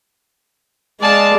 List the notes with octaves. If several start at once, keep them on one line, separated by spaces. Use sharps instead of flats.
G#3 G#4 D5 F5 A5